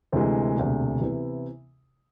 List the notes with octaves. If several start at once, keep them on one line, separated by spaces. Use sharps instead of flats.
D2 C3 E3 G#3
E1 D2 C3
C3 E3 B3 E4